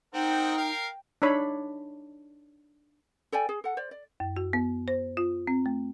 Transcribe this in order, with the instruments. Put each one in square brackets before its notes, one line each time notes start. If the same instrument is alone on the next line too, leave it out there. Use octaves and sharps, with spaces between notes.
[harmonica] C4 A#4 F#5 [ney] D#4 [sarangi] G5
[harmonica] A#4 F5
[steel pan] D4 D#4 C#5 B5
[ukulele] A4 D5 G5 G#5
G#4
A4 F#5
C5 D5
D5
[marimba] F#2
F#4
B3
C5
F4
C4
A3